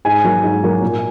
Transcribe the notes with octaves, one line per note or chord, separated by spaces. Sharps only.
G#2 G#5
F#3 A#3
G#2
F#3 A#3
A#2